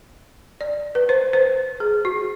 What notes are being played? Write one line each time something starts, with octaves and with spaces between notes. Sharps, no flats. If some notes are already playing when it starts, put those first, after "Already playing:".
D5
B4
C5
C5
G#4
F#4